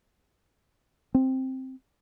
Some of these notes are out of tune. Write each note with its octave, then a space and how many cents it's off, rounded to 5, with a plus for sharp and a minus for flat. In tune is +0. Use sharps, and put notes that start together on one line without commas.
C4 +5